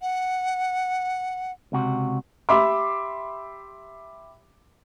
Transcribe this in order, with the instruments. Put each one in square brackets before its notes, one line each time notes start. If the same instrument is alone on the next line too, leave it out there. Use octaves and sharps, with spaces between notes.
[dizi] F#5
[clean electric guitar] C#2 C3 F#4
[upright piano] G4 E5 B5 C6 D6